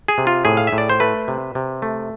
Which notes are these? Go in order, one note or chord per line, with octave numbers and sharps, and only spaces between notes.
G#4
C3
F4
A2 G#4
F5
E5
A2
D5
C5
A3 B4
C3
C3
A3